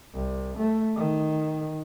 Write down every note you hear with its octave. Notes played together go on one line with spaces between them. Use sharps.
C2
A3
D#3